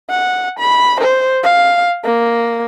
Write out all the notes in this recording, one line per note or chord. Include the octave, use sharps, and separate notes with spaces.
F#5
B5
C5
F5
A#3